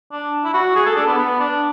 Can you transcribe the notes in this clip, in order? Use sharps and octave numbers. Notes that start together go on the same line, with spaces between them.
D4
E4
F#4
G#4
A4
D4
B3
B3
D4